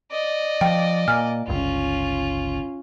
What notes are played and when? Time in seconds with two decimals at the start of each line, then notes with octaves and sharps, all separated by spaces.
0.12 D5 D#5
0.61 F3 G5
1.08 A#2 G#5 F6
1.48 G1 C#2 C#4 F4